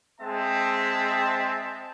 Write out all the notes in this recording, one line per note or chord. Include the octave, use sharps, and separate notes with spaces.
G#3 C4 E5 A5